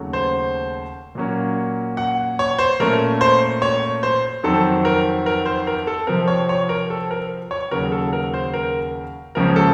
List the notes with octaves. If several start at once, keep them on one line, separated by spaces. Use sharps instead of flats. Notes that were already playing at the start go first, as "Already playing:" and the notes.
Already playing: D#2 C#3 F#3 A3 C#4
C5
A#2 F#3 A#3 C#4
F#5
C#5
C5
A#2 A3 C#4 A#4
C5
C#5
C5
F2 D#3 F#3 C4 A4
A#4
A#4
C5
A#4
A4
C3 F3 C4 A#4
C#5
C#5
A#4
A4
A#4
C#5
D#2 C#3 F#3 A#4
A4
A#4
C5
A#4
C#2 C#3 F3 A#3 C#4 A#4
A4